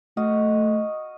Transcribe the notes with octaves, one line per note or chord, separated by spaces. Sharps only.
A3 F#4 D#5 F5